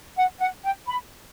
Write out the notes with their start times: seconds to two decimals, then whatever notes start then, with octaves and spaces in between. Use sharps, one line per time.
0.17 F#5
0.40 F#5
0.63 G5
0.87 B5